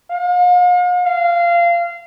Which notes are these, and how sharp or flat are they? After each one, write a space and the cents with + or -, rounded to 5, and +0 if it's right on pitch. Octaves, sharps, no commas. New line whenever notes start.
F5 +45
F5 -20